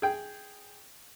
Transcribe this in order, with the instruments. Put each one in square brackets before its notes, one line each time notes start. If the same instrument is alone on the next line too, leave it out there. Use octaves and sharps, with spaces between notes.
[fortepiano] G#4 G5